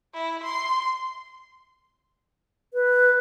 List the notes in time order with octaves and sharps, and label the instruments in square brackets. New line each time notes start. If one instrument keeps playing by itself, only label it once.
[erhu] E4
C6
[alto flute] B4